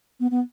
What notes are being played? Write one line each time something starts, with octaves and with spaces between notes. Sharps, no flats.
B3
B3